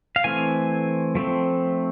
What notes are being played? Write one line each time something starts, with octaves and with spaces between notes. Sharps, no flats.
F5
E3 A3 C4 G#5
F3 A3 C4